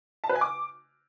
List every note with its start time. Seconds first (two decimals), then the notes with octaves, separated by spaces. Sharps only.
0.24 A5
0.29 B4
0.35 G#5
0.41 D6